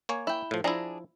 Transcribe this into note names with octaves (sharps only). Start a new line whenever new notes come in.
A#3 C#5 G#5
E4 G5
A2 F3
F3 D4 E4 G#4 A#5